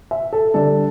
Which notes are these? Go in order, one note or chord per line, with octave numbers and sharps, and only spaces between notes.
E5
A4
D3 G3 D4 A4